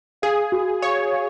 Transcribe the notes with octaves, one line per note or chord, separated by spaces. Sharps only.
G#4 F5
F#4
C#5 F5
F5